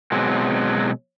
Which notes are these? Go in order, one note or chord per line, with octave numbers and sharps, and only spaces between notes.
B2 F#3 G#3 C4